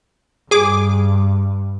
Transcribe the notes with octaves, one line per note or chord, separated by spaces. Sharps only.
G2 G#4 D6